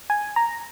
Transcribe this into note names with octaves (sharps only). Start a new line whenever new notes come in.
G#5
A#5